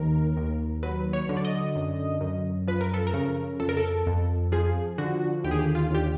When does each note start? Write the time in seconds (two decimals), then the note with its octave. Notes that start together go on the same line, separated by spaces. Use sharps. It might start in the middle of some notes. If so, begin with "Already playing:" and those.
Already playing: D#2 D#3 A#4
0.37 D#2
0.83 F#3 B4
1.13 C#5
1.29 D3
1.37 D5
1.45 D#5
1.76 F#2
2.21 F#2
2.68 F3 B4
2.81 A#4
2.94 A4
3.07 A#4
3.14 C#3
3.60 F2 A4
3.69 A#4
3.77 A4
4.06 F2
4.52 F3 G#4
4.98 D3 F#4
5.44 D#2 G4
5.51 G#4
5.59 G4
5.75 F4
5.91 D#2 G4